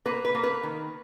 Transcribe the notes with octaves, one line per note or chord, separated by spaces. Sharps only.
A#3 B4
B4
A#3
B4
D#3